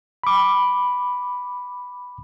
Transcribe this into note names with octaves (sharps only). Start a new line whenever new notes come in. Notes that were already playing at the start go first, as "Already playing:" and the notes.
B5 D6